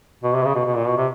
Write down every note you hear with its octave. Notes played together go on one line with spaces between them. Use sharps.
B2
C3
C#3
B2
B2
A#2
B2
C3